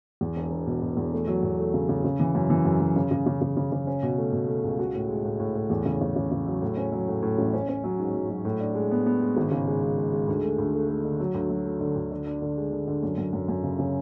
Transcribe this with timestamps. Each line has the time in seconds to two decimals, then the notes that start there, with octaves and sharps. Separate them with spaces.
0.21 E2
0.36 E1
0.51 E1
0.66 B2
0.82 B2
0.97 E2
1.12 A3
1.27 F#3
1.43 E2
1.59 A3
1.74 C#3
1.89 C#3
2.04 C#3
2.20 E3
2.35 F#2
2.50 E3
2.65 F#2
2.80 F#2
2.96 C#3
3.11 C#3
3.26 C#3
3.41 C#3
3.57 C#3
3.72 C#3
3.87 C#4
4.03 B2
4.18 A3
4.32 B2
4.48 A3
4.64 C#2
4.79 F#4
4.94 A2
5.09 G#3
5.25 A2
5.40 A2
5.55 A2
5.70 E2
5.86 C#3
6.01 C#3
6.16 C#3
6.31 C#3
6.46 F#3
6.62 A2
6.77 C#4
6.92 F#3
7.08 A2
7.22 A2
7.38 A1
7.53 C#4
7.69 C#4
7.84 F#3
7.99 G#2
8.14 F#3
8.30 F#3
8.45 A2
8.60 D4
8.75 G#3
8.91 B3
9.06 B3
9.21 G#3
9.37 G#1
9.51 C#3
9.68 G#3
9.82 G#3
9.97 G#3
10.13 G#3
10.28 D2
10.43 A3
10.58 D2
10.74 A3
10.89 A3
11.04 D3
11.20 F#3
11.34 D2
11.50 F#3
11.65 A3
11.80 D3
11.96 D2
12.11 D3
12.26 D4
12.42 D3
12.57 G#3
12.72 D3
12.88 D3
13.03 F#2
13.18 F#2
13.33 F#2
13.49 F#2
13.64 C#3
13.79 C#3